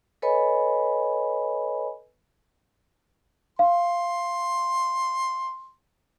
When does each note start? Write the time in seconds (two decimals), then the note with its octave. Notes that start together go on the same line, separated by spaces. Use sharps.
0.22 A4 B4 C#5 D#5 G#5 B5
3.59 F5 C6